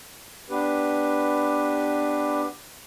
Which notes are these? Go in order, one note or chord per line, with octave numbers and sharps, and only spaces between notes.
B3 D4 G4 B4